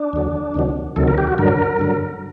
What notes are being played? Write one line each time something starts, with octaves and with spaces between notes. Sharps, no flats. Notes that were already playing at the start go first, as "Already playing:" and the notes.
Already playing: D4
D#2 D3 F#3
D2 C3 D#3 F#3
D2 C3 D#3 F#3 A4
A#4
G4
F#4
G2 D3 F#3 A#4
G2 D3 F#3